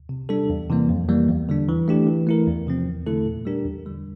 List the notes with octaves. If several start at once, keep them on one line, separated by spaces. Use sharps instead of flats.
C3
G3 D4 A4
E2
C3 E3 G3 A#3
F2
E3 G3 A#3
E2
D3 G3 D4
E3
A3 D4 G4
E3
A3 E4 A#4
E2
C3 F3 C4
E2
D3 A3 E4 A4
A#2
G3 D4 G4 A#4
E2
D3 G3